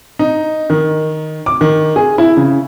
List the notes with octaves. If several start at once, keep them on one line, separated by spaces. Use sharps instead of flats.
D#4
D#3
D6
D#3
G#4
E4
C#3